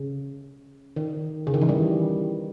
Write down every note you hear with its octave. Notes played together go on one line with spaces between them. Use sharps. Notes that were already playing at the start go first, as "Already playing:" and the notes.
Already playing: C#3
D#3
C#3
D#3
E3
G3